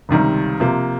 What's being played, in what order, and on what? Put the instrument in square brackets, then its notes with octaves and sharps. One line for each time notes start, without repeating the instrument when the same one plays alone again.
[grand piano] C#2 C3 D#3 G3
C3 F3 A#3